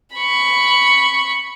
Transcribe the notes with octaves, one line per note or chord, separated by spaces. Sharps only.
B5 C#6